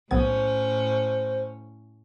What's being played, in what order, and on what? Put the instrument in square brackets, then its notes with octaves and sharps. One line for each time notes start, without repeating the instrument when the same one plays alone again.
[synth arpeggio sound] B1 B3 G#6 [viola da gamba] A2 C#4 [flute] C5